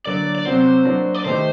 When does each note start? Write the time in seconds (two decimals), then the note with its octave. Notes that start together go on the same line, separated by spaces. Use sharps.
0.06 D3 F#3 A#3 D5
0.35 D5
0.45 C3 F#3 C4 F#4 C5
0.85 F#3 A#3 D4 F#4
1.14 D5
1.25 D#3 A3 D#4 G4 C5